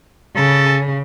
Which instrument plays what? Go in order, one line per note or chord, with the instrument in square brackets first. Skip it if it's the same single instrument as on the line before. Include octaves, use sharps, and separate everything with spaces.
[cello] C#3 [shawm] A4